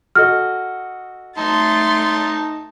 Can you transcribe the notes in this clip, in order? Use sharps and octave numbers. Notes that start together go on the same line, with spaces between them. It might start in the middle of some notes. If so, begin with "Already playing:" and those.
F#4 A4 D#5 F6
A3 D#4 A5 C6 A6